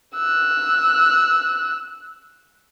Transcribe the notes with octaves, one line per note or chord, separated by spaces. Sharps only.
E6 F#6